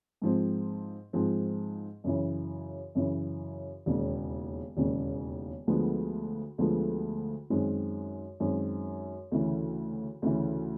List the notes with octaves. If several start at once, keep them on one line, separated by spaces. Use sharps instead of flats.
G#2 F3 G#3 C4
G#2 F3 G#3 C4
F#2 C#3 E3
F#2 C#3 E3
E1 D#2 C#3
E1 D#2 C#3
D2 D3 F3 G#3 B3
D2 D3 F3 G#3 B3
F#2 D#3 G#3 C4
F#2 D#3 G#3 C4
D2 C#3 E3
D2 C#3 E3